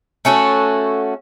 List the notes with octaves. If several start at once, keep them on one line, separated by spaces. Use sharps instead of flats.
A3 C#4 F#4 A4